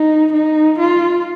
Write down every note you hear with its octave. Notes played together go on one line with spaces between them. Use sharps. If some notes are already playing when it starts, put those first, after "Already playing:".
Already playing: D#4
D#4
F4